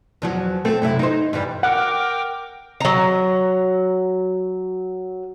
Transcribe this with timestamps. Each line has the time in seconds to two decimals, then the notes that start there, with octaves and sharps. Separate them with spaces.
0.22 E2 F3 F#3
0.65 A3 C4 A4
0.82 F#2 C3 E4
0.99 D#4 C5
1.33 G2 E3 G3
1.63 A#4 F#5 G5 D6
2.80 F#3 A#5